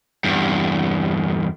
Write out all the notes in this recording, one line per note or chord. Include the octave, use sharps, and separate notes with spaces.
E2 G2